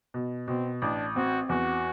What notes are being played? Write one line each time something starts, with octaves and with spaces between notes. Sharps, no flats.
B2
B2 C4
A1 D4
C4 F#4
E2 F#4